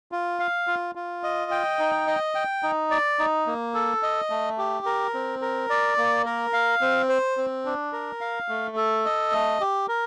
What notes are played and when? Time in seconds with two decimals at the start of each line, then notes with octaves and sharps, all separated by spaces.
0.12 F4
0.40 F5
0.67 F4
0.95 F4
1.23 D#5
1.51 G5
1.79 D#4
2.07 D#5
2.35 G5
2.63 D#4
2.91 D5
3.19 D#4
3.47 A#3
3.74 A4
4.03 D#5
4.30 A3
4.58 G4
4.86 A#4
5.14 C4
5.41 A#4
5.70 D5
5.97 A#3
6.26 A#4
6.53 F5
6.81 C4
7.09 C5
7.37 C4
7.65 D4
7.93 A#4
8.21 F5
8.49 A3
8.76 A4
9.05 D#5
9.32 A3
9.60 G4
9.88 A#4